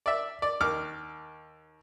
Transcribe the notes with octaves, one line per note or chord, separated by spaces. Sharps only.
D5 E5
D5
D#2 D6 F6